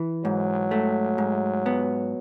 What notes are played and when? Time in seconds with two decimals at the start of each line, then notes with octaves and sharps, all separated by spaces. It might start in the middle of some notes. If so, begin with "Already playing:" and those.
Already playing: E3
0.24 G#2 F#3
0.71 A3
1.18 G#2
1.66 B3